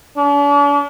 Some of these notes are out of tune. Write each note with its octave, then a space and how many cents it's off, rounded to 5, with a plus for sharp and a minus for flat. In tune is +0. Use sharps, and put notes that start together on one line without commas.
D4 -45